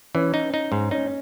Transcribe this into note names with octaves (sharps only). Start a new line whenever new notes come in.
E3 C#4
D#4
D#4
G#2
C#4 D#4